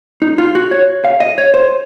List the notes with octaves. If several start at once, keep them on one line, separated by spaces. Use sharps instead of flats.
D#4
F4
F#4
C#5
F5
D#5
C#5
C5